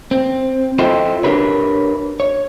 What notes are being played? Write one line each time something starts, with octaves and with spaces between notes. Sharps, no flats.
C4
E4 F4 A4 C5 D#5 G5
D4 G4 A#4 B4 C#5
C#5